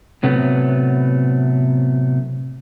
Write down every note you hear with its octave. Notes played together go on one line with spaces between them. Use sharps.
A2 C3 F#3 A3 B3